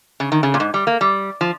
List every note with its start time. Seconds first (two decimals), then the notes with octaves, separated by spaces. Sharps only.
0.20 C#3
0.32 D#3
0.43 C#3
0.54 A#2
0.60 G#2
0.74 G3
0.87 A#3
1.01 G3
1.41 F3